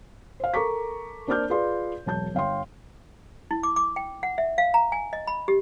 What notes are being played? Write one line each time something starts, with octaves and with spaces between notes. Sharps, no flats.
C5 F5
A4 A#4 A#5 C#6 D6 B6
A#3 D4 C5 D6 F6 G6
F4 G#4 B4 D5 F5 C6
E1 F#3 A5 G6
G1 F5 G5 C6
E4
D6
D6
G5
F#5
E5
F5
A#5
G#5
D#5
B5
G4